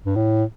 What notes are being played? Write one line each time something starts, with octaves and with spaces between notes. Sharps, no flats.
G2
A2